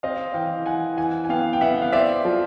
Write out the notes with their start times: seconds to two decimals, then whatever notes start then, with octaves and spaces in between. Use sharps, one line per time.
0.03 C4 D#5 F5
0.34 E3 F5 G5
0.66 E3 F#5 G#5
0.97 E3 F#5 G#5
1.25 G#5
1.29 B3 F5 G5
1.53 G5
1.61 B3 E5 F#5
1.82 F5
1.92 C4 D5 E5
2.25 F3